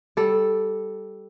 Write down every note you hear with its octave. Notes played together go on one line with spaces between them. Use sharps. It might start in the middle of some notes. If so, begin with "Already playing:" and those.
G3 A4